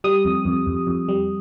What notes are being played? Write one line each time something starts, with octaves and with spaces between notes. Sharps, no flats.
G3 D#6
F2
F2
F2
F2
G3